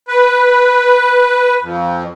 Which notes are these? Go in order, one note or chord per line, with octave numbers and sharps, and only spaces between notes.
B4
F2